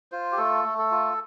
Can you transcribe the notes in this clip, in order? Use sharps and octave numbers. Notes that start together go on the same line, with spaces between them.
F4 C5
G4
A3 A4
A3
A4
F4